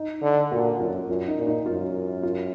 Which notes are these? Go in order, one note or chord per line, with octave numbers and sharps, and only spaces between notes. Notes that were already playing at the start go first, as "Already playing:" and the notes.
Already playing: D#4
D3
A#2 F#4
F#2 F4
F#2 F4
D#4
A#2
D#4
F#2 F4
F4